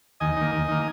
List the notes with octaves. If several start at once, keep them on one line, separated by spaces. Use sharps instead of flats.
D#2 D#5 G#5
D#3 A#3
D#2
D#3 A#3